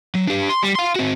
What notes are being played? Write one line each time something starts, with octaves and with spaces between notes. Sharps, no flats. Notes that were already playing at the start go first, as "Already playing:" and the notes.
F#3
D4 G4
C6
G3
F5 C6
C4 F#4